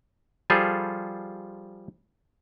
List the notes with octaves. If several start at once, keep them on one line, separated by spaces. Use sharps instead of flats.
F3 G3 F4 G#4 A4